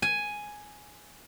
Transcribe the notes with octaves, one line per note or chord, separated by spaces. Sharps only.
G#5